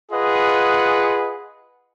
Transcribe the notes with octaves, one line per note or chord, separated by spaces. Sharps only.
F4 G#4 B4 D#5 F#5